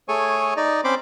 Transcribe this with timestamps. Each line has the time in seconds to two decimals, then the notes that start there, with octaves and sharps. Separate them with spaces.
0.08 A3 G#4 A4 C#5 G#5 C#6
0.57 D#4 D5 D#5
0.84 C4 C#4 C5 B5 C6 D6